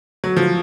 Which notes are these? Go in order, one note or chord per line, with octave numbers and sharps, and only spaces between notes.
F#3
F3